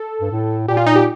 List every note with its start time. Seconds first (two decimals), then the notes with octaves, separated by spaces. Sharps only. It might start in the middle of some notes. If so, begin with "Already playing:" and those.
Already playing: A4
0.21 G2
0.31 A2
0.68 A#2 G4
0.77 F4
0.86 D#4
0.95 G4